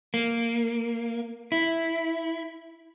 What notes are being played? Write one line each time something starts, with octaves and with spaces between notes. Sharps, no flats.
A#3
E4